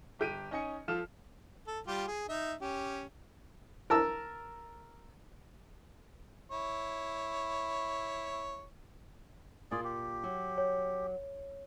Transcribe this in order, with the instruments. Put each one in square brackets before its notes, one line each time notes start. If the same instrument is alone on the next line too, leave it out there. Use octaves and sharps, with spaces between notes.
[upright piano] G1 G4 D7 D#7
C#4 D#4 D#5 G#5 C#7
F3 F4 A4 F6 E7
[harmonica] A4
G3 F4 G4
G#4
D#4 E5
C#4 G4
[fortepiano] A#4 A5 E6
[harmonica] E4 C#5
[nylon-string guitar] A#2 F4 [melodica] G#4 D5
[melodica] G4
[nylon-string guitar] F#3
[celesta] C#5